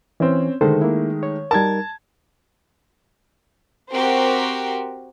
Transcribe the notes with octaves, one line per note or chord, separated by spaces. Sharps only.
E3 C4 C#4
D3 D#3 G#3 A3 A4 C5
A#3 E4
C#5
G3 D#4 A#4 A5 G#6
C4 F#4 G4 A#4 C5